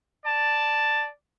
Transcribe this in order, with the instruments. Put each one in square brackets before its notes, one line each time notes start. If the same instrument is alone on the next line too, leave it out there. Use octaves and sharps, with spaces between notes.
[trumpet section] D5 A5